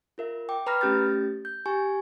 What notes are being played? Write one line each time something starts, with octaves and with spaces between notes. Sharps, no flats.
F4 A#4 E5
G5 D6
B4 A#5 B5 F6 A#6
A3 C#4 G4 G6 A6
G6
G4 G#5 C#6